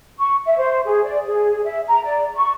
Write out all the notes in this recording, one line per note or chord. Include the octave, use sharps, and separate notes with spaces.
C#6
E5
C5
G#4
D5
G#4
E5
A#5
D5
C#6